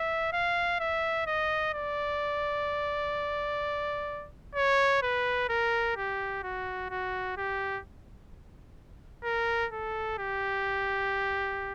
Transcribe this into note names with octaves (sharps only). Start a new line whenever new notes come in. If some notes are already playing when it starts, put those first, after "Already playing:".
Already playing: E5
F5
E5
D#5
D5
C#5
B4
A#4
G4
F#4
F#4
G4
A#4
A4
G4